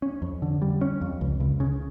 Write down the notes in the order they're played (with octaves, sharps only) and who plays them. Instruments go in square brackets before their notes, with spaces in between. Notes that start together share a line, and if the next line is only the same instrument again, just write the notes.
[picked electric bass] C#4
F2
D3
G3
C#4
F2
C#2
C#2
C#3